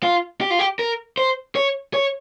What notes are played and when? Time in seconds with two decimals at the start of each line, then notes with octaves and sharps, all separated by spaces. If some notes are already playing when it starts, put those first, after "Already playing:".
0.03 F4
0.41 G4
0.50 F4
0.59 G4
0.79 A#4
1.18 C5
1.55 C#5
1.94 C#5